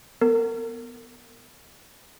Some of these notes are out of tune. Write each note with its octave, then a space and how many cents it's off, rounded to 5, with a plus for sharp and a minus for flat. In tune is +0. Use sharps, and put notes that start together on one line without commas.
B3 +0 A#4 -35